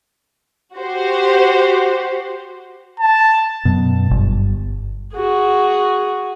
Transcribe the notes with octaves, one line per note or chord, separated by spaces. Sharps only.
F#4 G4 C5
A5
F#2 B2
G1
F#4 G#4